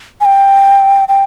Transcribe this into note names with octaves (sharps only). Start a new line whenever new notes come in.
G#5
G5
G5